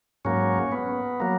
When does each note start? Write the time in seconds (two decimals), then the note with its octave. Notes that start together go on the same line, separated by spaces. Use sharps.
0.25 G#2 F#3 A#3 C#4
0.72 B3
1.20 F#3 A#3